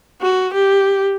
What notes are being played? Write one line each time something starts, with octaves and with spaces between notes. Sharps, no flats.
F#4
G4